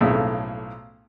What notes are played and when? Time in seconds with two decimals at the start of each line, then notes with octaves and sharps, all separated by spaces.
0.01 B1 F2 A2 C#3